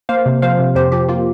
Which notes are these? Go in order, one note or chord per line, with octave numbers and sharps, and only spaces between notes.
A#3 C5 F5
C3
F3 C5 F5
C3
F2 G4 C5
F3 G4
A#3 F4